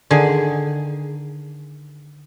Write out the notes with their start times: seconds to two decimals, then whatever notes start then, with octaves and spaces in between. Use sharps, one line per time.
0.11 D3 D#3 G#4